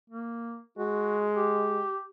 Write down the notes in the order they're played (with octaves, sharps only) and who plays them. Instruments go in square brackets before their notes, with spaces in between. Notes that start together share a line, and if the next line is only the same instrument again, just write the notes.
[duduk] A#3
[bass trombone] G#3 [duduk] F#4
[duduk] G4